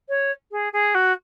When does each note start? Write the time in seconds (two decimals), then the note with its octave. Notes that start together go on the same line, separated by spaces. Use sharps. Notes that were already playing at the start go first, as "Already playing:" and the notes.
0.09 C#5
0.51 G#4
0.73 G#4
0.95 F#4